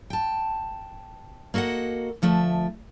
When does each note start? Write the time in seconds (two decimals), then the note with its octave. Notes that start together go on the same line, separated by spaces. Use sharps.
0.10 G5 A5
1.54 A#3 F#4 A4 D#5 F#5
2.22 D2 F3 A3 E5